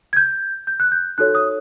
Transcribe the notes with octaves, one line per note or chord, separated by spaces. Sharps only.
G#6
G6
G6
F#6
G6
D#4 F#4 A4 C#5 F#6
D#6